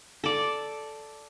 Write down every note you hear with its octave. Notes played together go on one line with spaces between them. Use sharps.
A4 D5